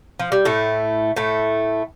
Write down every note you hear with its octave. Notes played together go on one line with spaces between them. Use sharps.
F3
G3
A2 A3
A2 A3